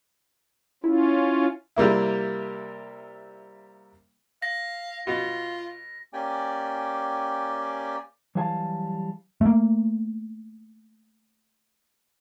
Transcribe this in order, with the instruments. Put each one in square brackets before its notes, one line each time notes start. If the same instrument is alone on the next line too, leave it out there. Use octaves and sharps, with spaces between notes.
[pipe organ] C#4 F4 [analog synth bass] E4
[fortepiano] C3 G3 A#3 E4
[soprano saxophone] F5 [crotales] A#6
[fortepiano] B2 [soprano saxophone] F4
[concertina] A#3 C#4 G4 D5 G5 G#5
[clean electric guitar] E3 F#3 G3 F5 G#5 A5
[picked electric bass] A3 A#3